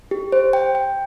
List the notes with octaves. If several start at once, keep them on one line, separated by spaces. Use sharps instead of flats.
G4
C5
G5
G5